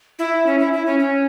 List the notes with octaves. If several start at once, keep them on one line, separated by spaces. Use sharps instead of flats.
E4
C#4
E4
E4
C#4
C#4